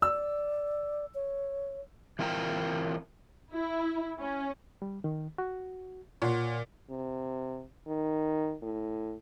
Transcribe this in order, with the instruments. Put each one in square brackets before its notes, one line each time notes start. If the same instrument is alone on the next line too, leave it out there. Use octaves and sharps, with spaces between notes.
[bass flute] D5 [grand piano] E6
[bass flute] C#5
[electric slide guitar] E3 C4 F4 A#4 G5 A#5
[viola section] E4
C#4
[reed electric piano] G3
D#3
F#4
[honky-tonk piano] A#2 [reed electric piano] C#5 F#5 C6
[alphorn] C3
D#3
A2